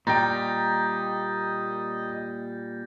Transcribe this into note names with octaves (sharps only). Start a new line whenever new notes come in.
A#2 G3 D#5 G5 A#5 G6 A6 A#6